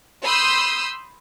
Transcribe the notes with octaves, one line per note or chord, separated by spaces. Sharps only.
B5 C6 D#6 E6 G6